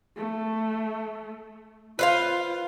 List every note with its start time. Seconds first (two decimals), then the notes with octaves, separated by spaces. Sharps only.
0.16 A3
1.99 F4 B4 C5 F5